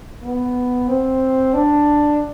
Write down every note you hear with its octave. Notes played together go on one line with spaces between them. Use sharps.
B3
C4
D4